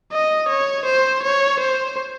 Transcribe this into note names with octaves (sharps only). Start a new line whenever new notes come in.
D#5
C#5
C5
C#5
C5